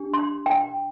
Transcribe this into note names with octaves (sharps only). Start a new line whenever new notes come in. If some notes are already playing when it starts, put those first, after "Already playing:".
Already playing: D4 G4
C6
G5